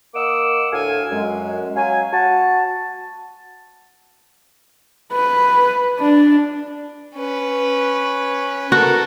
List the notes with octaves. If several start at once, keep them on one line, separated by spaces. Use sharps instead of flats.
A#3 D#5 F#5 D6 E6
D2 A2 F5 G#5
F#2 G#3
F#3 F5 G#5
F#4 A5
B4
D4
C#4 B4
F#4 A4 A#4